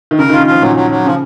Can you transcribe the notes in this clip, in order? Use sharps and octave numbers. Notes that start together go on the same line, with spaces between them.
D#3
C#3 A#4
D#3 F4
C#3
F3 F4
A#2 F#3
F#3
F#3
C#3 F3